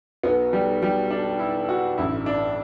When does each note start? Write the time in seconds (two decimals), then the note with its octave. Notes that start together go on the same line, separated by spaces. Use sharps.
0.23 B1 B2 B3
0.53 G3
0.83 G3
1.11 D4
1.39 E4
1.69 F#4
1.98 A1 G2 D3 E4
2.26 D4